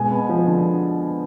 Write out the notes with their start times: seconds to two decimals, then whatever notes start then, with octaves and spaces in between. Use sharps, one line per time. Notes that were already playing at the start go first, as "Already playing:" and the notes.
Already playing: B2 G#3 G#5
0.11 B3
0.29 F3
0.47 D3